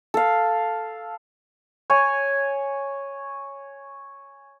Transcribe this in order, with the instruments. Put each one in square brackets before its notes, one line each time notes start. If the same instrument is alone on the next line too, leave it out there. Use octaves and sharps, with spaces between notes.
[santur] A4 F5
C#5 G#5